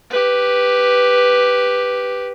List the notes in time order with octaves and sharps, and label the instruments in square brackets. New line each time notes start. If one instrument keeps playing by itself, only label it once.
[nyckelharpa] G4 B4